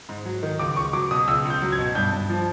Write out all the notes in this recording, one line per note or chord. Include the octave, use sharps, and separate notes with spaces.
G#2
F#3
D#3
C#2 D6
C#2 C#6
F#3 D6
B2 D#6
C#2 E6
C#2
G6
F#3
G#6
B2
G2 G6
G2
F3